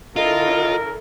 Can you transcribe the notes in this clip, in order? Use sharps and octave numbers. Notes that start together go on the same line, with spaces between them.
D3 E4 F4 A4 A#4 D#5